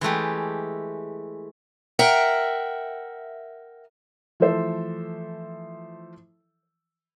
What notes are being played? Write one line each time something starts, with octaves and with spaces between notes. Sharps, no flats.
E3 G#3 A3 G4
A#4 E5 F#5 G5
E3 F3 A3 A4 C5 E5